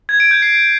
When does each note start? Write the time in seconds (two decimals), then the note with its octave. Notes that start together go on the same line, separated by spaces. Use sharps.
0.09 G#6
0.20 D7
0.31 G6
0.42 C7